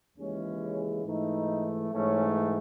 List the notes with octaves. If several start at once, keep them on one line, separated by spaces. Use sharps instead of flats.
D#2 C#3 E3 G#3 C#4
G#2 E3 A3 D#4
G#2 E3 A3 C#4